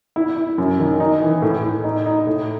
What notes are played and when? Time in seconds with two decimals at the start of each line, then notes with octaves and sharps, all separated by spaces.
0.16 E4
0.36 E4
0.58 F#2
0.80 D#3
1.00 D#4
1.22 E3
1.42 A2
1.64 A2
1.84 D#4
2.06 D#4
2.27 A2